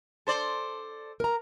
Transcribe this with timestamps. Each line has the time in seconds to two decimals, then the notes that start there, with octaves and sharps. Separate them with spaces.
0.27 A4 C5 D5
1.20 A#4 A#5